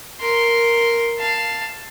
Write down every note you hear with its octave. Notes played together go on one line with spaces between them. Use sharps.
A#4 C6
F5 A5